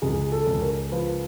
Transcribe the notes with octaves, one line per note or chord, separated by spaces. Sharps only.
C#2 G#4
A4
C#2
A#4
F3 B4